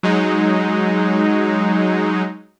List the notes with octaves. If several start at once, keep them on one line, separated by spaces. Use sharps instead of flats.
F#3 G#3 D#4